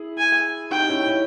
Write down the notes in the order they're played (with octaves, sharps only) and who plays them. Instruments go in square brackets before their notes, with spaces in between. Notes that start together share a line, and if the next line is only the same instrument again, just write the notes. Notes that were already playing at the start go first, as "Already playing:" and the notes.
Already playing: [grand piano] E4 G#4
[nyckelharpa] G#5
[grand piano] D#4 G4 [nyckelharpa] G5
[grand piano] C#4 E4
C#4 E4